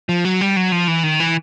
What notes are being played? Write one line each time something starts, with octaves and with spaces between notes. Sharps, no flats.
F3
F#3
G3
F#3
F3
E3
D#3
E3